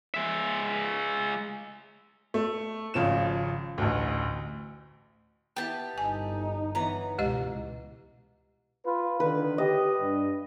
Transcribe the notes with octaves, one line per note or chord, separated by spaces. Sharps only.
G#3 E5
A3
G#1 C#3 F3 E7
A1 D2
B3 E4 G4 A5
G1 D#4 G#5
E3 B3 C#5 A#5
C#2 B2 G#3 G4 D#5
F4 B4
D3 D#3 B4
G4 D#5
G2